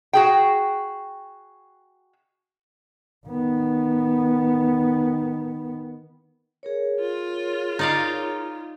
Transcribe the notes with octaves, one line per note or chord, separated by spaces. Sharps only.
F#4 G#4 G5
D#3 B3
G#4 A#4 C#5
F4
D#4 D5 F5